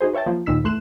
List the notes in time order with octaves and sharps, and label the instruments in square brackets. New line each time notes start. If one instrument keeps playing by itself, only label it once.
[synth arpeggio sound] D#4 F#4 G#4 C5
B4 C#5 E5 G5 A5
F3 A#3 C5
D#2 A#2 D#4 E6 B6
E2 A3 C6 F#6 E7